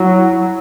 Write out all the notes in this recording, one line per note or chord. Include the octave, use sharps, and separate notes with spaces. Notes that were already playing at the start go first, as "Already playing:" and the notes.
Already playing: F#3 E4 F#4